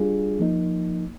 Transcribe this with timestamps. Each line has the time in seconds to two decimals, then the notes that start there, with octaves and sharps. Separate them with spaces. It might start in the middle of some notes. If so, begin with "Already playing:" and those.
Already playing: G3 D4 F4 G#4
0.39 F3 A#3 D#4